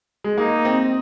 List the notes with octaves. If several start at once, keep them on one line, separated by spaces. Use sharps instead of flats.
G#3
A#3 D#4
C4